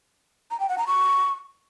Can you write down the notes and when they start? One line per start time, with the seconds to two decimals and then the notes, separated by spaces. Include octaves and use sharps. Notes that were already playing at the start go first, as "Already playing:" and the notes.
0.51 A#5
0.60 G5
0.69 F#5
0.78 A#5
0.87 C#6